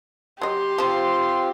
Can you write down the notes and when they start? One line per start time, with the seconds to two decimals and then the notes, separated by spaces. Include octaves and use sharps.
0.42 F#3 G4 D#5 C6
0.78 F3 C4 F4 C5